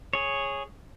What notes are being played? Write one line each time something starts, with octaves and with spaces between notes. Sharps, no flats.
G#4 C#5